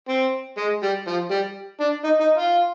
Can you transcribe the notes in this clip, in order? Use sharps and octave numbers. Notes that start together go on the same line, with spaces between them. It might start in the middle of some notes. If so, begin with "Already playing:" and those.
C4
G#3
G3
F3
G3
D4
D#4
D#4
F4